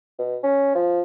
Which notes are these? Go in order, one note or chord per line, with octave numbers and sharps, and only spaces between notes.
B2
C#4
F3